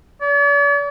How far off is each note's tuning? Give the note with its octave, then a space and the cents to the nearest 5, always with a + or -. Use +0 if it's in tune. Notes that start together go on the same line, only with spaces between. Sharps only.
D5 -45